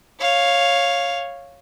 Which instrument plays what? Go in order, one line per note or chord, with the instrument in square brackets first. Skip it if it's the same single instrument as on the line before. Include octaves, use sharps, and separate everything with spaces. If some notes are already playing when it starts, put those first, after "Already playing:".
[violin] C#5 F5